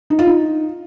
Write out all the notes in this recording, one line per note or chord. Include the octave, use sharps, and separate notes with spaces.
D#4
F4
D#4